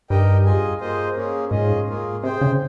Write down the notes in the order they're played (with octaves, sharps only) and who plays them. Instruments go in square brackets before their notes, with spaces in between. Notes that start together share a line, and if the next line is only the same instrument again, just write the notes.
[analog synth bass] G2 [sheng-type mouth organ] D#4 G4 A#4 D#5 G5
[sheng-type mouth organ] F4 G#4 D#5 G#5
A#3 F4 G#4 C5 D#5
A#3 C#4 G#4
[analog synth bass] G#2 [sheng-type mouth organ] C#4 F4 G#4 D#5
[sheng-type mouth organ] A#3 F4 G#4
[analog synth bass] C3 [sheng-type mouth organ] G#4 C5 G5
[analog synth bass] C#3